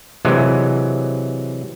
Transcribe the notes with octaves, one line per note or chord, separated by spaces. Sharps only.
C3 E3 F#3 G#3